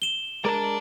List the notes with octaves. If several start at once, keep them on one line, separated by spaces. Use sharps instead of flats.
E7 G7
G#3 A#4 D5 A5